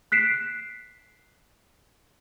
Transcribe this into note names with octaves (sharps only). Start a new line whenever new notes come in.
F#6 B6 C7 D7 E7